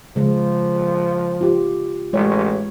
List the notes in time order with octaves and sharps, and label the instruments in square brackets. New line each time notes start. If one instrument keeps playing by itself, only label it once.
[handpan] C#3 G#3 [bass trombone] F3
[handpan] F4 G4
[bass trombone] A1 [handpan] G#3 C#5